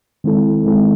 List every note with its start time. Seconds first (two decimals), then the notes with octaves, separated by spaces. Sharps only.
0.24 D#3 G#3 C4 E4 A4
0.64 D#3 G#3 C4 E4 A4